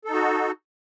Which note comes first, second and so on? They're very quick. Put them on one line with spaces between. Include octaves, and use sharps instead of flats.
A4 D#4 F#4